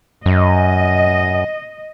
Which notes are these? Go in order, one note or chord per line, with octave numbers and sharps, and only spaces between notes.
F#2 D#5